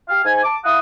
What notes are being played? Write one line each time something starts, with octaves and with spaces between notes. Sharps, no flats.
G4 F5
G#2 G#5
A5 D6
E4 F5 F#5 D#6